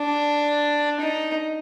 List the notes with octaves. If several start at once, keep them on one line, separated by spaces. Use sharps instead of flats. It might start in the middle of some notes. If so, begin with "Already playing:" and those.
Already playing: D4
D#4